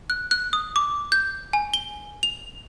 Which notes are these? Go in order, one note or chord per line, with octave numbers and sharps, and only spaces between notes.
F#6
F#6
D#6
D6
G6
G#5
G7
F7